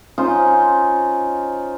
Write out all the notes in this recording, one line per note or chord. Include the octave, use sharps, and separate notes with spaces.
C#4 D#4 F4 C5